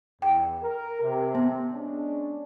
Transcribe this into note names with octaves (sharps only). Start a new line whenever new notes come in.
E2 G5
A#4
C3
B3
G#3 C#4 D4